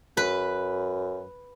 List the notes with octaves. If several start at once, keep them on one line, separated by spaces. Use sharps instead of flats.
F#2 B4